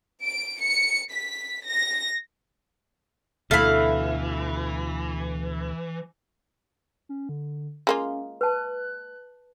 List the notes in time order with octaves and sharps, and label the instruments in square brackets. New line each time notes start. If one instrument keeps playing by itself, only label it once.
[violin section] D7
C#7
B6
A#6
[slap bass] D2 B2 [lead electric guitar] E3 [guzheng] A3 E4 [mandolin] F5 B5
[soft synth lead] C#4
D3
[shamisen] G#3 A#3 F4 [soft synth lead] C#4
[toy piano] B4 A5 [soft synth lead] F#6